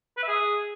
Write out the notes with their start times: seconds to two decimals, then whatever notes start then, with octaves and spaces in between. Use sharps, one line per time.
0.18 B4
0.23 E5
0.28 G#4